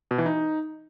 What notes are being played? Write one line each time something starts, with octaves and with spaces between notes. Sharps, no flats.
B2
E3
D#4